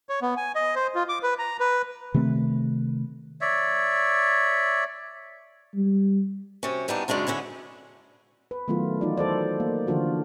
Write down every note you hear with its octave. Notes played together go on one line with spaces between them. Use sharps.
C#5
B3
G#5
D#5
C5
F4
D6
B4
A#5
B4
C3 D#3 A3 C4
C#5 D5 E5
G3
F#2 C3 C#4
E3 G3 G#3 B3 D4 D#4
F#2 C#3 G#3 D4 F4
D3 C#4 E4 G#4
B4
D#3 F#3 A3 B3 E4 F4
E3 D#4 F4 F#4 D5
A4 C5 D5
A#3
D3 E3 F3 D4 F4 F#4